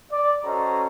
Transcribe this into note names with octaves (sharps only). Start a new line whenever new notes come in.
D5
C#4 F#4 A4 C5 D#5 A#5